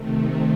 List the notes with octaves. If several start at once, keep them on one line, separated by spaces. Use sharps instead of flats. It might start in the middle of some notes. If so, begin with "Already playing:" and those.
Already playing: C3 D#3 A3